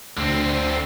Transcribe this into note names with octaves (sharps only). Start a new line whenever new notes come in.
D2 D3 C4